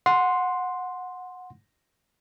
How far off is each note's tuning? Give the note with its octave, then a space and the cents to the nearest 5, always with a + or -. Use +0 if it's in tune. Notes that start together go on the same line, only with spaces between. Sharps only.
F#5 -20 C6 +0